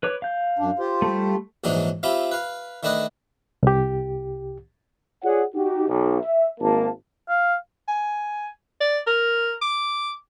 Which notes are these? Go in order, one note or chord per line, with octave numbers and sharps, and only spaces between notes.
B4 C#5 D6
F5 G6
F#2 D4
F4 G4 C5
G3 A3
A#1 G#2 E3 F#3 D4 D#4
C4 F4 G4 E5 B5
B4 F5
D#3 A3 D4 B4 D#5
C2 G4
F4 G#4 C#5 D5 F#5
D#4 F#4 G4
B1
E5
G#1 A#3 A5
F5
G#5
D5
A#4
D6